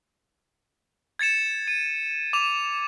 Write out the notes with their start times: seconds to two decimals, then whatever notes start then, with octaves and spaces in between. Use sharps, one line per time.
1.19 G#6 A6 C#7 E7
1.68 D#7
2.33 D6 F7